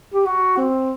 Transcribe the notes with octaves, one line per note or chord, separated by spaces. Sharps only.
G4
F#4
C4